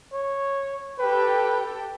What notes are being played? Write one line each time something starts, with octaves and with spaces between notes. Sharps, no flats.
C#5
G4 A4 B4 G5